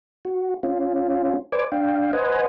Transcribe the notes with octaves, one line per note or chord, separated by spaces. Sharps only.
F#4
C#4 F4
B4 C5 D5 G#5 D6
D4 F5 G5
B4 C5 D#5 F#5 G#5